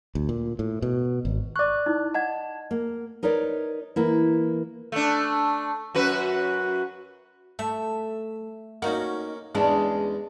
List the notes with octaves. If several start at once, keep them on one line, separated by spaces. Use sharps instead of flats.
D2
A#2
A2
B2
G#1
D5 C#6 D6 F#6
D#4 E4
D#5 F#5 A5 G#6
A#3
D#4 A#4 B4 C#5 D5
E3 A#3 E4
A3 D4
F#2 F#4 B4
A3 E5
A#3 C#4 D#4 F#4
E2 G#3 C#4 D4